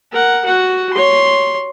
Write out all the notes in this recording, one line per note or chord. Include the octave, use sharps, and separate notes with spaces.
A#4 F#5
F#4 F#5
C#5 C6